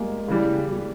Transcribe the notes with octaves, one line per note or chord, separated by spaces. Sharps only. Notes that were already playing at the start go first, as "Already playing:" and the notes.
Already playing: G3 G#3 A#3
C#3 E3 G3
G3